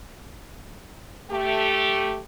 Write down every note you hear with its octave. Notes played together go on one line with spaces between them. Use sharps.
A3 G4